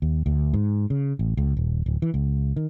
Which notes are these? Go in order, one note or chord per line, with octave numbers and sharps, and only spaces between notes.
D#2
D2
G#2
C#3
A1
C#2
D#1
D1
E3
C#2
D#3